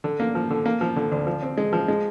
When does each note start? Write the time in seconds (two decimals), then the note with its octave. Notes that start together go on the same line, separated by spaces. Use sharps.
0.04 D3
0.20 A#3
0.35 F3
0.50 D3
0.66 A#3
0.81 F3
0.96 D3
1.12 D2
1.27 F3
1.43 C4
1.57 G#3
1.73 F3
1.88 G#3